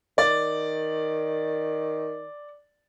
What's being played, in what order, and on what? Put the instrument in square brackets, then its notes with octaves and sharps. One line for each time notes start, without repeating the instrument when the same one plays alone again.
[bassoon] D#3 [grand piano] D5 A6